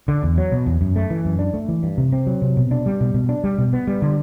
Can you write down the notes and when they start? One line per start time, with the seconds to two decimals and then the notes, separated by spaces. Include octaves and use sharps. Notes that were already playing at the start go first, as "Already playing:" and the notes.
0.08 D3
0.23 E2
0.38 F#3
0.52 B2
0.66 E2
0.81 F#2
0.96 A3
1.10 E3
1.25 F#2
1.39 D4
1.54 A3
1.69 E3
1.83 G2
1.98 C3
2.13 C4
2.27 F#3
2.42 C3
2.57 B2
2.71 D4
2.86 G3
3.01 B2
3.14 B2
3.29 D4
3.44 G3
3.58 B2
3.73 B3
3.87 G3
4.02 D3